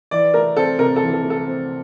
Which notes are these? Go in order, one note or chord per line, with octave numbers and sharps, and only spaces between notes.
E3 D5
A3 A#4
C4 A4
C3 A#4
A4
E3
A4
A3
A4
C4